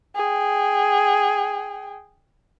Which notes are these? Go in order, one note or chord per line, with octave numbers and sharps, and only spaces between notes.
G#4 G5